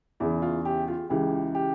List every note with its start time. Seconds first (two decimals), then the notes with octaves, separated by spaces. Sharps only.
0.20 E2 C#3 E3 E4
0.42 F4
0.65 G4
0.88 F4
1.10 C#2 C#3 E3 G4
1.55 G4